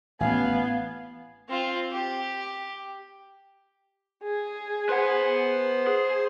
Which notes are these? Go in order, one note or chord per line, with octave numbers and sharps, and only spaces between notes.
A1 B3 F5 G#5
C4 F4
G4
G#4
B4 C5 F#5
G#4